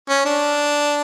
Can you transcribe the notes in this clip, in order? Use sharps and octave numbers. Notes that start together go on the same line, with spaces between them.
C#4
D4